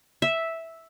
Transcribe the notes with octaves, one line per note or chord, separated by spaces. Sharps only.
E5